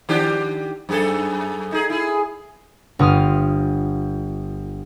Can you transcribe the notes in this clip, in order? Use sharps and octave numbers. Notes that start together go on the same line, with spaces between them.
D#3 D4 G4
F#2 G#4 A4
D#4 G#4
E4 G#4
G1 F4 D#6 F6